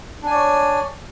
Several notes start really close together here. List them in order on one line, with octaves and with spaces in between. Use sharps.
D4 G#5 D5 C#5